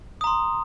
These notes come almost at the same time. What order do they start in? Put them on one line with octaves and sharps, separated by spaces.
D#6 A#5 C6